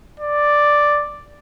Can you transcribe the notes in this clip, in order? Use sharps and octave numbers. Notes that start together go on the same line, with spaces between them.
D5